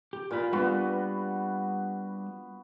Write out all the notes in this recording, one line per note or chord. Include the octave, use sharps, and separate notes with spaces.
G4
A#2 F4 A#4 B5
G3 B3 D4 F4 F#4